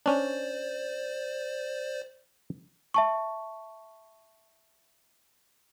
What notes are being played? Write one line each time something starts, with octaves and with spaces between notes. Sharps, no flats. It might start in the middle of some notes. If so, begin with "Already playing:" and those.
C#4 D4 C5 D5
E5 A5 C#6